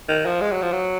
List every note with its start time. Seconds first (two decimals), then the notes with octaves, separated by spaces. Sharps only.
0.09 D#3
0.26 F3
0.41 G#3
0.51 F#3
0.62 F3
0.73 F#3